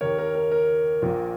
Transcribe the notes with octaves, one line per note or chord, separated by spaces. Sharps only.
D#2 D#3 A#3 A#4 C#5
A#4
A#4
A#4
A#1 A#2 A#3